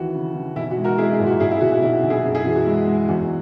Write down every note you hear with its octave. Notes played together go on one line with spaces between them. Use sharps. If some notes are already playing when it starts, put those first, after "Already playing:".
Already playing: D#2 E3 F#4
C#3
E3
B1 E4
F#4
G#3
F#4 A#4
G#3 E4 G#4
E4
A#2
F#4
A#2 E4 G#4
E4 G#4
B1 F#4
F#4
B1 E4
B1
E4 G#4
F#2
E4 G#4
E3 F#4
F#4
G#3 E4
G#3
E2 F#4